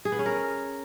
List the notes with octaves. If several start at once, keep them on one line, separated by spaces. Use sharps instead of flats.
G#4
B3
C#4
A#4